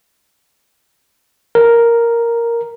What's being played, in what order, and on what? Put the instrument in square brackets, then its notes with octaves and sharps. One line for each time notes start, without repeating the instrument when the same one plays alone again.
[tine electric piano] A#4